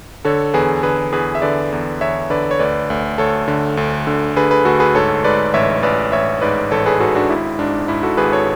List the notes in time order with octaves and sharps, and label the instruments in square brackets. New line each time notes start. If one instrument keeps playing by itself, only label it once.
[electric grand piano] D3 A4 C#5
E2 G#4 B4
D3 G#4 B4
E2 G#4 B4
E5
D3 B4 D5
E2
E2 C#5 E5
D3 B4 D5
C#5
D2 B4 D5
D2
D2 A4 C#5
D3
D2
D3
D3 G#4 B4
G#4 B4
D2 F#4 A4
G#4 B4
G#2 A4 C#5
G#2 B4 D5
A1 C#5 E5
A1 B4 D5
A1 C#5 E5
G#2 B4 D5
A1 A4 C#5
G#4 B4
G#2 F#4 A4
D4 F#4
G#1 E4
G#2 D4
G#2 E4
F#4 A4
G#1 G#4 B4
A4 C#5